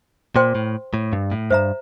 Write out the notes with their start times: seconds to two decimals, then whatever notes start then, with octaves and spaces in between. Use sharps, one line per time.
0.36 A#2 C5 G5 C6
0.55 A2
0.94 A2
1.13 G2
1.31 A2
1.51 G2 C5 E5 A#5